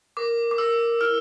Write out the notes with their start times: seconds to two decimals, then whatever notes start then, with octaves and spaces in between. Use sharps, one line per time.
0.17 A#4 D6
0.51 D6
0.58 A#4 E6
1.01 E4 F6